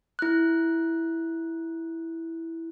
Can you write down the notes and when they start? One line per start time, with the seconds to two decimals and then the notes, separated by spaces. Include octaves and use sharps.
0.19 E4 F#6